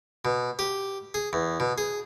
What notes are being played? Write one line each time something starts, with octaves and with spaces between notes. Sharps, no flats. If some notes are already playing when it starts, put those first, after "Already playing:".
B2
G4
G#4
E2
B2
G#4